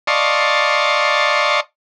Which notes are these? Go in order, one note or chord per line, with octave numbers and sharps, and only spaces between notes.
D5 D#5 F5 A5 C6 C#6